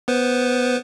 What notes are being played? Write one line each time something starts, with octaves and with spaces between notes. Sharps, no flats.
B3 B4 C5